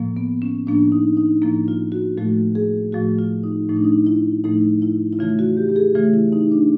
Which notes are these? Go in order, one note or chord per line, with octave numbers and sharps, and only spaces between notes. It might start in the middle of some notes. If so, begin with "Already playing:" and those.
Already playing: A2 F3 A#3
B3
C#4
A2 F3 A#3 D4
D#4
D#4
A2 F3 A#3 E4
F4
F#4
A2 F3 A3 F#4
G#4
A2 F3 A3 F#4
F4
D#4
A2 F3 A3 D#4
D4
D#4
E4
A2 F3 A3 D#4
E4
E4
C#3 E3 A3 F4
F#4
G4
G4
G#4
C#3 E3 A3 F4
E4
D#4
D4